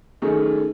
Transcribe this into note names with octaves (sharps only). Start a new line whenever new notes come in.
F#2 D#3 A3 D#4 G#4